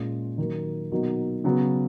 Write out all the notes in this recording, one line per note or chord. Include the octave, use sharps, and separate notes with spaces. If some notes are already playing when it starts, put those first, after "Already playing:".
Already playing: A#2 G#3 C#4 F4
D#3 F#3 A#3
B2 F#3 A#3 D#4 F#4
C#3 F#3 B3 F#4